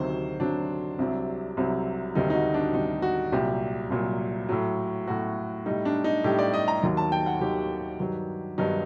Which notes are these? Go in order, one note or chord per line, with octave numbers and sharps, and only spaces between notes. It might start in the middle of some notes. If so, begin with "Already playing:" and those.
Already playing: D2 C3 D#3 F#3 C5
D2 C3 D#3 F#3 D4
C2 C3 F#3
C2 C3 F#3
D2 C3 D#3 G3 D#4
D#4
F#4
D4
D2 C3 D#3 G3 D#4
F#4
C2 A#2 F#3 G4
C2 A#2 F#3
A2 F#3
A2 F#3 F#4
A2 G3 D#4
D4
D#4
A2 G3 G4
D5
D#5
A#5
D#2 D#3 F#3
A5
G5
F#5
D#2 D#3 F#3 G4
G2 D#3 F#3
G2 D#3 F#3 D#4